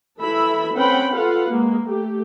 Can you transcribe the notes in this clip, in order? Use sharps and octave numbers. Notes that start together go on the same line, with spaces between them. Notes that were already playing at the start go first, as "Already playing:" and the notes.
E3 E4 A4 E5 B5
C4 C#4 B4 F#5 G5 B5
F4 A4 B4 F5 F#5
G#3 A#3
A3 G4